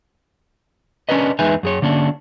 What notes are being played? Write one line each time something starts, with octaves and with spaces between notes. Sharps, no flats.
C#4 D4 A#4 B4 D#5
E2 G#3 D#4 B4 E5 G#5
F#2 G#4 C#5
D3 A#3 C#4 D4